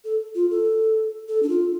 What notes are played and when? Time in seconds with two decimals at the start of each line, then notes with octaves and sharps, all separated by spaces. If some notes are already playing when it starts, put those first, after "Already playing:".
0.04 A4
0.35 F4
0.51 A4
1.28 A4
1.43 D4
1.49 F4